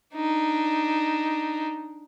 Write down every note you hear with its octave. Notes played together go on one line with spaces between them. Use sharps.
D4 D#4